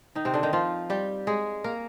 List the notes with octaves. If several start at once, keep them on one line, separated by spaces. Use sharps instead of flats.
D#3 D#4
C3 C4
D3 D4
D#3 D#4
F3 F4
G3 G4
G#3 G#4
A#3 A#4